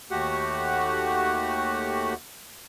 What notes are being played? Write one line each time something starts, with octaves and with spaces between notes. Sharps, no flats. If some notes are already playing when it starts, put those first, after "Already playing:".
D#2 A3 F#4 G4 F#5